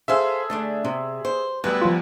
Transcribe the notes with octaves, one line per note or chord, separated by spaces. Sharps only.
G#4 A4 C5 E5 F5
D3 A3 D4
C3
C5
D2 G3 B3 B4 E5
F3 F4